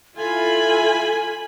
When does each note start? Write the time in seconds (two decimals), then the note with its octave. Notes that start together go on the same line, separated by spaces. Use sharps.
0.17 E4 F4 A4 G#5 B5